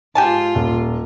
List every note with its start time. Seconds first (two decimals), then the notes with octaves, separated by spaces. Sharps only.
0.15 G#2 F4 G4 G#5 A5
0.55 D#1